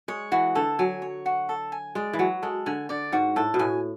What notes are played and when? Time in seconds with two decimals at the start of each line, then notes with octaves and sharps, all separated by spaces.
0.08 G#3 C#5
0.32 E3 F#4
0.55 D3 A4
0.79 F#3 G#5
1.02 C#5
1.26 F#4
1.49 A4
1.72 G#5
1.95 G#3 D5
2.13 E3
2.19 F#3 F#4
2.42 G#3 A4
2.66 D3 G#5
2.89 D3 D5
3.12 G#2 F#4
3.36 A2 A4
3.54 B2
3.59 A2 G#5